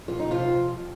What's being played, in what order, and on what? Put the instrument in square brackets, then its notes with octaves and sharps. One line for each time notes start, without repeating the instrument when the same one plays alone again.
[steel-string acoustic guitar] F2 F4
D#4
C3 F3 F4
F3
F2